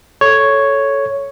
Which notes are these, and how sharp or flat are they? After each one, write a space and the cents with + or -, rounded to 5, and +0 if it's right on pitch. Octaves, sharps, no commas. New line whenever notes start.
A4 -5 C#5 +0